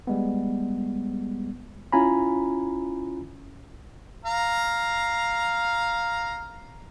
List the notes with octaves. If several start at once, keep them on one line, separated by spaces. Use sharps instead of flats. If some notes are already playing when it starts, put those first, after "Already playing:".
G3 G#3 B3
C#4 E4 F4 G#5 A#5 B5
F5 A#5